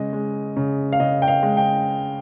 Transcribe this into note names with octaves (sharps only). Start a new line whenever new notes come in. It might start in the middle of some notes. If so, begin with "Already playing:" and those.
Already playing: C#3 G#3 D#5
G#3
C#3
F5
C#3 D#5
G5
F5
G#3
G5